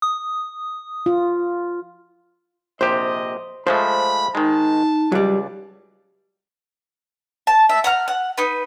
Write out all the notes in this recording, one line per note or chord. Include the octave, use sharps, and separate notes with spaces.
D#6
F4
A#1 C3 G4 C5 D#5
F3 G#3 A3 C5 B5
D#3 G#3 D#4 A5
C#2 F#3 G3 D5
A5
E5
F#5 A#5 F6
F#5
D#4 B4